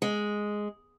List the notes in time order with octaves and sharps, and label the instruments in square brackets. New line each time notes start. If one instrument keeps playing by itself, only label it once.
[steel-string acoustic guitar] G#3